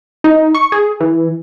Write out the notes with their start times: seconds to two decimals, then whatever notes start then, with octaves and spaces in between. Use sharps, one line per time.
0.24 D#4
0.55 C#6
0.72 G#4
1.01 E3